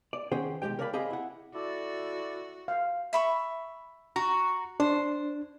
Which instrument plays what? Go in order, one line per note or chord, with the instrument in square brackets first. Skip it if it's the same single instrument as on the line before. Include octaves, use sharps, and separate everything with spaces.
[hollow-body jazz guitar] D5
D#3 C#4 G#4 C5 F#5 G5
B1 F3 G#3 G4 G5
A#4 C#5 D5 F5 A5 B5
C4 G4 G#4 D#5 F5 B5
E4 F#5
[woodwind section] E4 A4 D5 [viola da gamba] F#4
[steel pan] F5
[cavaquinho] E5 B5 C#6
[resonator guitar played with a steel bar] F#4 [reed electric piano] A#5
[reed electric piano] D4 [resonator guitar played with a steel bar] C5